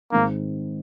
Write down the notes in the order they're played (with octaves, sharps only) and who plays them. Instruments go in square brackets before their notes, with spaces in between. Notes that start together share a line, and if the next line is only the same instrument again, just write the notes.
[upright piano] G#2 D#3 G#3 C4 D#4 [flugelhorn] A#3